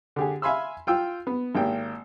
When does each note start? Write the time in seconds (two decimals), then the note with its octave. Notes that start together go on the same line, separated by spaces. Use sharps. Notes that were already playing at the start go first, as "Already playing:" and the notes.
0.16 D3 G4 G#4
0.42 E5 F5 G#5 B5 C6 E6
0.87 F4 G5 E6
1.27 B3
1.55 G#1 A#3 G4 G5